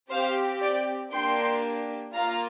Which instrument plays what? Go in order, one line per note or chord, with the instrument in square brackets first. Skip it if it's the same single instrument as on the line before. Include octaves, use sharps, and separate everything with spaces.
[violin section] C4 G4 C5 F5
D5 G5
A#3 D4 G4 G5 C6
A#3 F4 F5 A#5